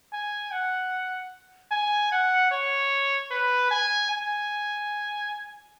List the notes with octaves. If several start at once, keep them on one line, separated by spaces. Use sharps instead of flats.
G#5
F#5
G#5
F#5
C#5
B4
G#5
G#5